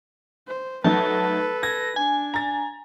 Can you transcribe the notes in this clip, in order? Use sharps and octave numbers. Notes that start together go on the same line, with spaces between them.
C5
F#3 A3 D#4 A4 B4 A5
G#6 A#6
D4 G#5
A#5 A6